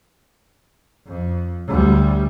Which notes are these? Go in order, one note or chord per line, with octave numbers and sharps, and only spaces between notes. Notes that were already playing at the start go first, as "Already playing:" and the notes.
F2
D2 G3